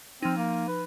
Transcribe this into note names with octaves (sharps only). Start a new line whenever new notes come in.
F3 C4 D#4
A#3
B4